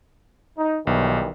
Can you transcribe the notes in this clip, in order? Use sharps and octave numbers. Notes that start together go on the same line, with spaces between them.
D#4
B1 D#3 E3 G3